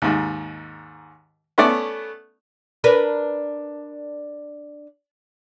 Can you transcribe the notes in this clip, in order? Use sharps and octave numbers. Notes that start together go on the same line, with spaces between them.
D#2 G#2
A3 B3 C#4 A4 D5
D4 A#4 B4